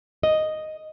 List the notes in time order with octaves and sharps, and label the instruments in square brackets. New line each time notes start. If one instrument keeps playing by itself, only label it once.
[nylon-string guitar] D#5